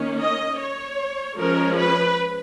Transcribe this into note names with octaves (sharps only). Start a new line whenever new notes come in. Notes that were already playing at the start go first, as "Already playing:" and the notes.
Already playing: D#3 A#3 C#4
D#5
C#5
F3 G#3 C#4 A#4
B4